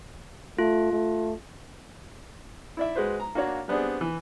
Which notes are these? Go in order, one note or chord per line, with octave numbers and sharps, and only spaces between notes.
A3 F4
A3
E4 D5 E5
G#3 F#4 B4 C5
A#5
A#3 D4 F#4 C#5 F5
G3 B3 C4 D4 G#4
E3